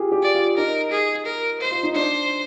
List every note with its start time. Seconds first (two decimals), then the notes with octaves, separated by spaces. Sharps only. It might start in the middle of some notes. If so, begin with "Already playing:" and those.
Already playing: F4 G4 G#4
0.12 G4
0.23 D5
0.35 F4
0.57 D#4 A#4
0.92 G#4
1.26 A#4
1.61 C5
1.71 F4
1.83 D#4
1.95 D4 C5